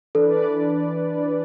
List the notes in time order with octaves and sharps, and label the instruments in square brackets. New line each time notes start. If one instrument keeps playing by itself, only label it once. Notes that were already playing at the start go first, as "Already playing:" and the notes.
[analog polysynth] E3 D4 B4 D5 [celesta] A4